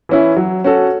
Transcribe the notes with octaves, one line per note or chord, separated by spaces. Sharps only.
E3 C#4 E4
F#3
C#4 F#4 A4